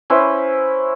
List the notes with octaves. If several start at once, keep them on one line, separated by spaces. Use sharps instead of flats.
C#4 E4 B4 C5